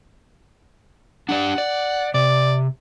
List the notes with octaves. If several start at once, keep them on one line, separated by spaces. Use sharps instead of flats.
D4 G4 D5 F#5
D5
C3 D5